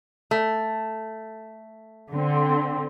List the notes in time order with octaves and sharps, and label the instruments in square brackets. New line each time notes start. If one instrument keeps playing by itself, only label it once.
[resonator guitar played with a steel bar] A3
[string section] D3 C4